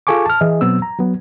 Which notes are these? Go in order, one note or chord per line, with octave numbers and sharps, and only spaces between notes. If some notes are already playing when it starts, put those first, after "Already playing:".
F4 G#4 A4 G#5 C#6 D6
A5 F6
E3 E4 G#4 D#5
B2 F#3 B3 C4 E6
A#5
F#3 B3